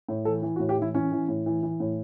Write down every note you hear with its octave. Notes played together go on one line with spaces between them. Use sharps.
A2
E3 A4
E3
F#4
A2
G4
E3 E4
E3 C#4
E3
A2
E3
E3
A2